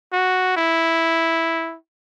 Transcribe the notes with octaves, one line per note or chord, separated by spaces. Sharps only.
F#4
E4